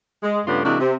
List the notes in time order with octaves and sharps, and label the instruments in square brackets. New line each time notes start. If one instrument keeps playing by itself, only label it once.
[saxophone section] G#3
G2 C#3 A3 B3 D4 F4
C3 E3 G#3 A#3 D4 F#4
C3